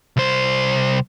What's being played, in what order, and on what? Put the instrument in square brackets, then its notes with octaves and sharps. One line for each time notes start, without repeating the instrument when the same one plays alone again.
[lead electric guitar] C2 C5